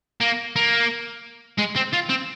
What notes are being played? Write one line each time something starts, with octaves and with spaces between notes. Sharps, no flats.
A#3
A#3
G#3
C4
F4
C4